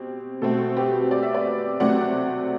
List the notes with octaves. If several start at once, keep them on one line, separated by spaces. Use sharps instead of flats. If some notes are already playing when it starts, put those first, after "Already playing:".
Already playing: B2 C4 G4
B2 A3 C4 F#4 A4
G4 B4
D5
E5
B4 D5
C3 F#3 A3 C4 D5 F#5